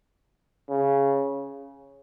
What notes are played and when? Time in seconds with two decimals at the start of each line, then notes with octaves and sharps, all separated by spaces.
0.69 C#3